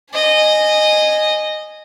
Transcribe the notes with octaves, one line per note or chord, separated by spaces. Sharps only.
D#5 G#5